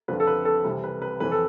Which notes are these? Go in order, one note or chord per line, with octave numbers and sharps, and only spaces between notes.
F2 D3 F3 B4
A4
B4
A4
C2 C3 E3 B4
B4
B4
F2 E3 B4
A4